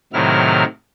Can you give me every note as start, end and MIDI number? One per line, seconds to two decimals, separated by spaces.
0.13 0.64 45
0.13 0.64 48
0.13 0.64 51
0.13 0.64 54
0.13 0.64 64
0.13 0.64 89